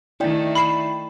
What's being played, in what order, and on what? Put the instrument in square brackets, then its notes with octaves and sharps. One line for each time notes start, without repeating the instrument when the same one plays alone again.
[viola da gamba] D#3 A3 [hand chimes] E4 D5 G5
[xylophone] B5 C7 E7